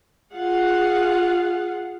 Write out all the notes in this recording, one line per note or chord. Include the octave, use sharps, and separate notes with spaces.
F4 G#4 F5 F#5